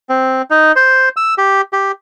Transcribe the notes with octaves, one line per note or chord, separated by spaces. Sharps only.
C4
D#4
C5
E6
G4
G4